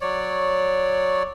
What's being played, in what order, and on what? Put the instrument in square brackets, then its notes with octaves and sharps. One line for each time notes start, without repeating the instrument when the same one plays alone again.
[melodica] F#3 C#5 D5